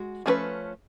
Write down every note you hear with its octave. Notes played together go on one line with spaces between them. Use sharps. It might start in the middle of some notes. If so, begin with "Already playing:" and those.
Already playing: G#3 F#4
F3 A3 C#4 G#4 B4